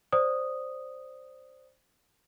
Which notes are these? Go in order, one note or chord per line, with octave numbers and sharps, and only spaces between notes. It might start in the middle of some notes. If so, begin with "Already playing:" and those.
C5 D5 D#6